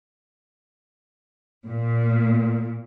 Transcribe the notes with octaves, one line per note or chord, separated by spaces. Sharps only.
A#2